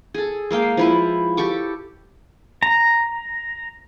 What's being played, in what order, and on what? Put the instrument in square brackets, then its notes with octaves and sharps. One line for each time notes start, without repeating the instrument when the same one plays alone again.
[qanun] G#4 A4
G#3 A#3 F5 G5
F3 E4 B4
G4 A4 C#6 D6
[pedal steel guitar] A#5